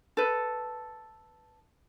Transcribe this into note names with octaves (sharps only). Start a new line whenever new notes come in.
A4 B4